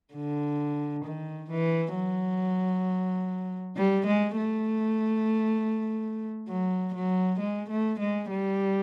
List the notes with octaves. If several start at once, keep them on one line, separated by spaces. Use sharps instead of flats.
D3
D#3
E3
F#3
G3
G#3
A3
F#3
F#3
G#3
A3
G#3
G3